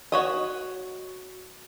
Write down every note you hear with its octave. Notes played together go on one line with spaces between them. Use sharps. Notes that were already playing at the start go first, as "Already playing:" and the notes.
F#4 C#5 D#5